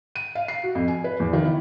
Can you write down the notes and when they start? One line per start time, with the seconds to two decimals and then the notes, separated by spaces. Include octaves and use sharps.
0.16 D#7
0.35 F5
0.48 C7
0.63 F#4
0.75 F2
0.88 G#5
1.04 B4
1.20 E2
1.33 D#3
1.45 E4